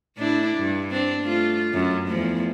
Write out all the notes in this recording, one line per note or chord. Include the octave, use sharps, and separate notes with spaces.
A2 D4 E4
G2
C4 D4
A3 F4
F#2
E2 F3 A3